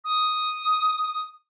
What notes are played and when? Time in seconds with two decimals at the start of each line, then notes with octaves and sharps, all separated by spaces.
0.04 D#6